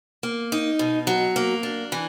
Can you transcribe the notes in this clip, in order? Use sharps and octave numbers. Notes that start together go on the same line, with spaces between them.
A#3
D#4
B2
F#3
A#3
D4
E3